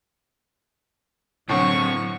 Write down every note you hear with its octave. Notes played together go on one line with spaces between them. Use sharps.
A2 D3 E3 F#3 C4 C#6